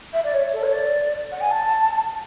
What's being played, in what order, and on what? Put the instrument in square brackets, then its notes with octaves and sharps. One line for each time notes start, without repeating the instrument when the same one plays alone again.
[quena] E5
D5
C#5
A4
C#5
D5
F#5
G#5
A5